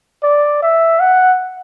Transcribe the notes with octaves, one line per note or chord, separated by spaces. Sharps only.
D5
E5
F#5